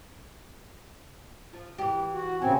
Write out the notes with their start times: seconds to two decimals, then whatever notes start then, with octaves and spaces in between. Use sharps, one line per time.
1.53 F3
1.78 E3 G4
2.14 F#4
2.42 A#2 C#3 C4 G#5